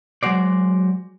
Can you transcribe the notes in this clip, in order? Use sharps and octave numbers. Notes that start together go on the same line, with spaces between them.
F#3 G#3 F#4 C5 D5